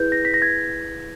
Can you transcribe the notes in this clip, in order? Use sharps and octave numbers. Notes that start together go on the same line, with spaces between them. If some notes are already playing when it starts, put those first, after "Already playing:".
Already playing: E4 G#4 B4 G6
A#6
B6
A#6
G#6